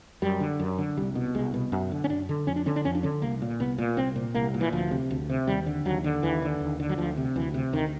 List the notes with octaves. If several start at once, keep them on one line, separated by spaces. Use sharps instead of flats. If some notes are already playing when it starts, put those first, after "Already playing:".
F#2 G3
D3
F#2
D3
C2 G3
B2
C2 G#3
B2
F#2
D3
C#4
F#2 D4
D3
F2 C#4
D4
D3 C#4
D4
F2 C#4
D4
D3 C#4
C2 A#3
A#2
C2 B3
A#2
C2 C4
A#2
C2 A#3
A#2
E3
D2 F3
C3
D2
C3
D#2 G3
D3
D#2 F#3
D3
D#2 E3
D3
D#2
D3
F#3
D2 F3
C3
D2 E3
C3
D2 D#3